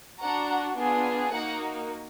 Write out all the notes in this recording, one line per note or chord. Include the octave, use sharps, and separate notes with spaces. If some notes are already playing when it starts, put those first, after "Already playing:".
D4 F#4 F#5 A#5
B3 D4 F4 G#4
A#3 D#4 F#4 F#5 A#5